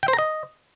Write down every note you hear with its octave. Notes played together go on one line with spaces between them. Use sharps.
G5
C5
A#5
D#5